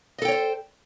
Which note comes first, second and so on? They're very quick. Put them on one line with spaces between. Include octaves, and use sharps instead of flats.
D#5 A4 G5 C#5 C5